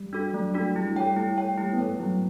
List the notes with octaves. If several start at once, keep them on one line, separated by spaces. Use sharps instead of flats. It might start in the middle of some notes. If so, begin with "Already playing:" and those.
Already playing: G3
D4 F#4 A4
F#3 A3
D4 F#4 A4
G3 E4
G3 A4 C#5 G5
A3 E4
A4 C#5 G5
G3 E4
B3
A3 A4 C#5 G5
F#3 E4